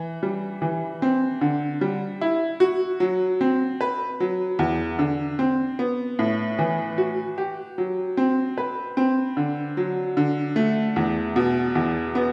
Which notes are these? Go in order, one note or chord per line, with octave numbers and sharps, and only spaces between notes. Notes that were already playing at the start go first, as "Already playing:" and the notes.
Already playing: E3
G3
E3
C4
D3
G3
E4
F#4
F#3
C4
B4
F#3
E2
D3
C4
B3
A2
E3
F#4
G4
F#3
C4
B4
C4
D3
F#3
D3
A3
E2
B2
E2
B3